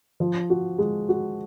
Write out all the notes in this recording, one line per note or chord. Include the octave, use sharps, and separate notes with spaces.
F3
F#4
G#3
F#4